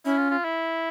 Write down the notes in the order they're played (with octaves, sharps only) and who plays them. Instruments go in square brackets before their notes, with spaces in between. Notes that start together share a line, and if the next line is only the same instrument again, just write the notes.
[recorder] C#4 [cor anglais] E4
[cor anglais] F4
F4
E4